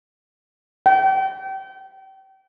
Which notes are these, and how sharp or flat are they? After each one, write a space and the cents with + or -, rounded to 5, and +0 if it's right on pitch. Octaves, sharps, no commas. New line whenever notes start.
G5 -30